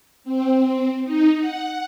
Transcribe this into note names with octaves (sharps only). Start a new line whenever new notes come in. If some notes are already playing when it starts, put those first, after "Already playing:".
C4
D#4
F#5